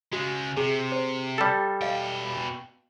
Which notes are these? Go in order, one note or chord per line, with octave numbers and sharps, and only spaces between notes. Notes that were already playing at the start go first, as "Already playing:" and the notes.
C#3 G#3 F#4
C3 G#4
C5
G3 A4
B2 D#5 F5 G5